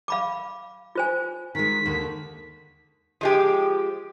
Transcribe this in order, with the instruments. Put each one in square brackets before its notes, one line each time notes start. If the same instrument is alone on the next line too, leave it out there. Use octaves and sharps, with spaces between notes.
[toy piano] F5 B5 D6
F4 C5 G#5
[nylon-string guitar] D#3 G#3 [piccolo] B6
[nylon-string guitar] D#2 D3
[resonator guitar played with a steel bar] F3 G#3 G4